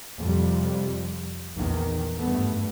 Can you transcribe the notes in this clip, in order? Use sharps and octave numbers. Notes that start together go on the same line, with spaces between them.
F2 C3 G3
A#1 E2 D#3
G#1 G2 A3 B3